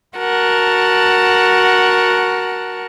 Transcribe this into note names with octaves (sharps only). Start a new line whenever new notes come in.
F#4 A#4 F#5 A5